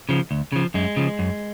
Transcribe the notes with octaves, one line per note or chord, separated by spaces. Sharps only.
C#3 F3
D2
C#3 F3
F#2 G#3
C#3 F3
F#2